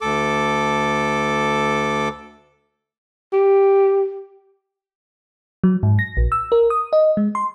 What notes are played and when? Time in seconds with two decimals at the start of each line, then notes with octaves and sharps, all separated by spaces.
0.01 D2 A4 D6
3.33 G4
5.64 F#3
5.83 G#2
5.99 A#6
6.17 A#1
6.32 E6
6.52 A#4
6.70 D#6
6.93 D#5
7.17 G#3
7.35 C6